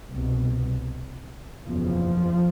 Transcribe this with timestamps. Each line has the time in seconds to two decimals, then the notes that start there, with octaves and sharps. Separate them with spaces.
0.11 C2 B2
1.64 F#1 E2 B2 F3